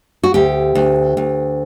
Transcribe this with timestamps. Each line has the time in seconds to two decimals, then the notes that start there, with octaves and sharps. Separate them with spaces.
0.23 F#4
0.34 D2 G4
0.75 D2
1.17 D2